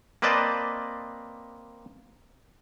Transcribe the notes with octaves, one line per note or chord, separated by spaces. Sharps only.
A#3 C4 B4 D5 D#5 A5